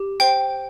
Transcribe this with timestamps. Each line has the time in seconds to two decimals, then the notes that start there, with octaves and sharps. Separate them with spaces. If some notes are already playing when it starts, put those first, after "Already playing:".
Already playing: G4
0.20 C5 G5